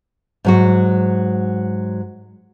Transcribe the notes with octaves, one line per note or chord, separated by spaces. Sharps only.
G#2 F#3 F#4